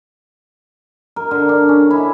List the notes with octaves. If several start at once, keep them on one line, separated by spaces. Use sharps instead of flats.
A#4
D3
D4
C#4
E4